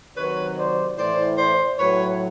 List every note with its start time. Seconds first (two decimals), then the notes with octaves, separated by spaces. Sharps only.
0.16 C3 D#3 F#3 B4 C#5
0.56 C5 D5
0.97 A2 E3 C5 D5
1.37 C5 D5
1.78 A2 F#3 B4 C#5